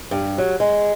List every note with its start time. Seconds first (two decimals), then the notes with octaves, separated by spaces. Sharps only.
0.11 G2
0.38 F#3
0.60 G#3